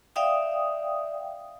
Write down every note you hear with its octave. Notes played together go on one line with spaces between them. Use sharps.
D5 E5 F5 G5 D#6